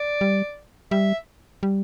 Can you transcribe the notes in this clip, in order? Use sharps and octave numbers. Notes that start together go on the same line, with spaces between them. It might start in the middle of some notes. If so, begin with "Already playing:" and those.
Already playing: D5
G3
G3 E5
G3